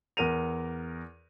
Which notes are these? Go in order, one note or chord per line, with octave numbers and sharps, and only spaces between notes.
E2 A#4 D#7 F7